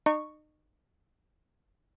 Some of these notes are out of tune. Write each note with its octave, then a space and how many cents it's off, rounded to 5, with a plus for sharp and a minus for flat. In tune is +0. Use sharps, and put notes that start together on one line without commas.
D#4 -35 C#6 +0